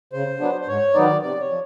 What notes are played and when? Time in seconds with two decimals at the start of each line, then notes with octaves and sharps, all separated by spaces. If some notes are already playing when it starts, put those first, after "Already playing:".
0.13 C#3 C5
0.40 F#3 B3 D4
0.61 C5
0.67 G#2 C#5
0.94 D#3 F#3 B3 D#4 D5
1.22 C3 D5
1.41 C#5
1.49 F3